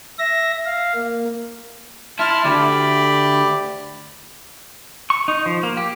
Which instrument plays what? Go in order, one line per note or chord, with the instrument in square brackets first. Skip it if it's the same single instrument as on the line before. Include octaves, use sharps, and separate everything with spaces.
[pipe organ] E5 A#6
F5
A#3
[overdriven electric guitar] E4 [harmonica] A5 C6 F6
[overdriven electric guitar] D2 [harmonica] G4 D5 B5
[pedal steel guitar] C#6
D#4
F3
A#3
G4